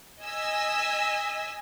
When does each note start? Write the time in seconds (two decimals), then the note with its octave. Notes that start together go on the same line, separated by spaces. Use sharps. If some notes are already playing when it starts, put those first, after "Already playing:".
0.22 D#5 G#5 E6 B6